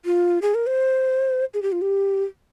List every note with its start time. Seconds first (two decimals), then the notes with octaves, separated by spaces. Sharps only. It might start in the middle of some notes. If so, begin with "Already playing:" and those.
0.05 F4
0.42 G#4
0.55 A#4
0.67 C5
1.54 G#4
1.62 G4
1.72 F4
1.82 G4